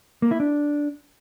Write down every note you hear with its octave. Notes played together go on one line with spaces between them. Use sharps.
A#3
E4
D4